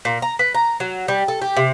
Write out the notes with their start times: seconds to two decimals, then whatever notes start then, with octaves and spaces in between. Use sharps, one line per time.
0.05 A#2
0.22 A#5
0.39 B4
0.54 A#5
0.80 F#3
1.08 G3
1.28 A4
1.42 G4
1.57 C3